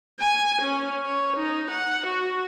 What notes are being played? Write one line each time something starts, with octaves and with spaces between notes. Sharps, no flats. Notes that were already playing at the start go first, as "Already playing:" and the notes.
G#5
C#4
C#5
D#4
F#5
F#4